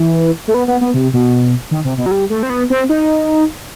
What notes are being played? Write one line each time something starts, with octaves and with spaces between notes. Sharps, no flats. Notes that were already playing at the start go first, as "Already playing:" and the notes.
Already playing: E3
A3
B3
B3
B3
C3
B2
D#3
C3
B2
F#3
G3
A3
C4
B3
C4
D#4